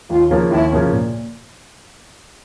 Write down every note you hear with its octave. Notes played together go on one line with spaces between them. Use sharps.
D#2 F4
C#3 F3 A#3 C#4
D#2 E4
C#3 F3 A#3 C#4
A#2